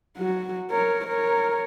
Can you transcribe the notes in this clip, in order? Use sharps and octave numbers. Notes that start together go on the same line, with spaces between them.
F#3 F#4
A#4 C#5
A#4 C#5